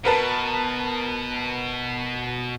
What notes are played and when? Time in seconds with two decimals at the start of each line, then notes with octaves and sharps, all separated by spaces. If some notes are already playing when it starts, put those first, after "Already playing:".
0.05 B2 A#4 B4 A5